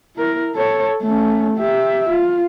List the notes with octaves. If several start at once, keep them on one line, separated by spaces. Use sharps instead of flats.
E4 A#4
A4 C#5
A3 C#4
G4 E5
F4